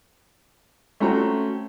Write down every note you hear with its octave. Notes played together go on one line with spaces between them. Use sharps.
A3 C4 C#4 F#4 A#5